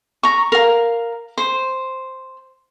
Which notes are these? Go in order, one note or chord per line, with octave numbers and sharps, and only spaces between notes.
A#5 C#6
A#4 F5
C5